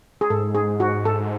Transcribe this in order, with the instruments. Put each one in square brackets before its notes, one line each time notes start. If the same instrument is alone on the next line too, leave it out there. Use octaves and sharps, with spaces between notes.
[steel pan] G#4
[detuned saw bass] G#2 [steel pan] A4
[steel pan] G#4
F#4
A4